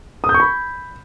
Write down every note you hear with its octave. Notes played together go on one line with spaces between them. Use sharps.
D#6
G6
C#6
B5